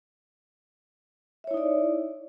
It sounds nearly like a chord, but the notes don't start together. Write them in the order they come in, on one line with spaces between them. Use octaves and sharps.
E5 C#5 E4 D#4 D5